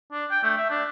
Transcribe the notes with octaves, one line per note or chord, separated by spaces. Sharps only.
D4
G5
A3
E5
D4